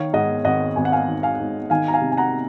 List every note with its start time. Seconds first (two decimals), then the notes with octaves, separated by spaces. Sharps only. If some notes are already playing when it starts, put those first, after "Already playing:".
Already playing: D#3 C#5 F5
0.13 G#2 D#5 F#5
0.45 G#1 D#5 F#5
0.76 G#1 G#5
0.85 F#5
0.92 F5 G#5
1.08 D#3
1.23 F5 G#5
1.40 G#2
1.70 D#3 F5 G#5
1.88 A#5
1.93 F5 G#5
2.01 C3
2.11 G#5
2.17 F#5 A#5